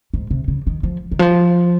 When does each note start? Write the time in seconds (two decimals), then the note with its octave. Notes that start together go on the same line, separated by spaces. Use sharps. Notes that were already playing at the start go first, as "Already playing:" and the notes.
0.14 G#2
0.31 C3
0.48 C#3
0.67 D#3
0.83 F3
1.12 D#3
1.19 F3